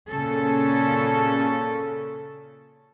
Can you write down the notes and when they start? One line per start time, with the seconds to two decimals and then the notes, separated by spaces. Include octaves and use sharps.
0.10 A#2 C#3 C#4 A4